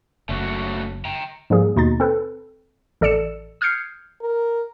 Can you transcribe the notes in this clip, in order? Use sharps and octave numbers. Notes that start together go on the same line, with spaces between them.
F#1 A3 C#4 F#4
G5 A#5
G#2 F3 G3 A#3 G#4
D#2 B2 D#4 C6 A6
C4 A4 B4
A1 A4 D5 E6 C#7 E7
D#6 F6 G6 G#6 C7 C#7
A#4